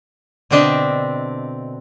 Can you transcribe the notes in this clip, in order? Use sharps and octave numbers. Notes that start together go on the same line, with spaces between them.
B2 D3 C4 D4 D#5 E5